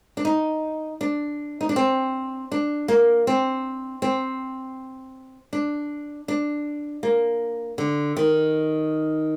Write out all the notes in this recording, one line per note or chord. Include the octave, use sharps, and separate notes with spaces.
D4
D#4
D4
D#4
D4
C4
D4
A#3
C4
C4
D4
D4
A#3
D3
D#3